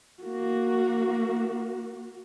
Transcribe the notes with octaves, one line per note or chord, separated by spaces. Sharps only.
A#3 F#4